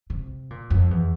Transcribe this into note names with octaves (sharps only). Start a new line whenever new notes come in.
C3
A#2
F2
E2